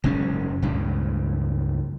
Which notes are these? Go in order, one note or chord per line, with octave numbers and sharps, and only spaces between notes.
F#1 G#2 G#3 C#4
C#2 G2 A#2